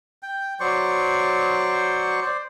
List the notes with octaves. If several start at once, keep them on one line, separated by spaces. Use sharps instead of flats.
G5
F#3 C5 D5 C#6
C5 D5